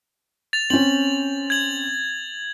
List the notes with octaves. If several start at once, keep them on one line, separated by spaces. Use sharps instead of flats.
A6 F7
C4 C#4 F#7
G#6 F#7